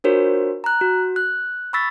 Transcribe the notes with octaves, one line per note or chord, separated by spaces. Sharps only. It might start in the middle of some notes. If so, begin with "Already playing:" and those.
D4 F4 F#4 A#4 C5 C#5
A#5 F#6
F#4
F#6
B5 C#6 E6 A6 B6